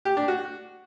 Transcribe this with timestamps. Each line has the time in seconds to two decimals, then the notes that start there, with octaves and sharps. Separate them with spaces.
0.05 G4
0.17 D4
0.28 F#4